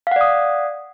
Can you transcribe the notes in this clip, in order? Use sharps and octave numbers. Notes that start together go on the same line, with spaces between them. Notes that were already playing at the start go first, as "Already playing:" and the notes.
D5 F5 F#5 D#6